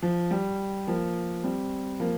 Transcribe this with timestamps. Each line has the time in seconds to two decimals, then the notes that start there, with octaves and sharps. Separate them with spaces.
0.02 F3
0.31 G3
0.87 F3 A#3
1.44 G3 C4
2.00 F3 A#3